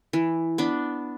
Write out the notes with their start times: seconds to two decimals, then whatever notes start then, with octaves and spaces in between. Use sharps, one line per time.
0.13 E3
0.58 B3 D4